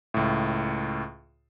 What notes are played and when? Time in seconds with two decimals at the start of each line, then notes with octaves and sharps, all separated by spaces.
0.14 C#2 A2